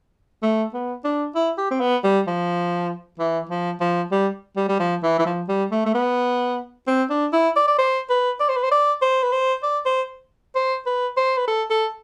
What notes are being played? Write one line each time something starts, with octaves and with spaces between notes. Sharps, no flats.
A3
B3
D4
E4
G4
C4
B3
G3
F3
E3
F3
F3
G3
G3
G3
F3
E3
E3
F3
G3
A3
A3
B3
C4
D4
E4
D5
D5
C5
B4
D5
C5
B4
C5
D5
C5
B4
C5
D5
C5
C5
B4
C5
B4
A4
A4